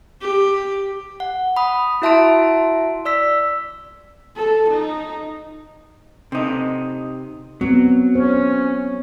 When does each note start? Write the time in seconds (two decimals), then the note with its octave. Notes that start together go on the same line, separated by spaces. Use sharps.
0.21 G4
1.20 F#5
1.57 B5 D#6
2.02 E4 F#4 E5 A5 C6 D7
3.05 D5 E6 B6
4.36 A4
4.70 D#4
6.32 C3 D#4
7.61 F#3 B3 C4
8.15 C#4 C5